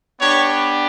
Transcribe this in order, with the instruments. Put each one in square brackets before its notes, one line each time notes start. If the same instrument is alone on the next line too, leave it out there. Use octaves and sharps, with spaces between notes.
[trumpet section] B3 D4 G4 C#5